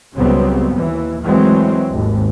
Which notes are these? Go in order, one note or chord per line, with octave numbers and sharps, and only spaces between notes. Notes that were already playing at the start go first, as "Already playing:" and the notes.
C#2 C#3 F#3 G3 B3 C4
D#2 E3
E3 F#3 G#3 A3 C4
G#1 D#2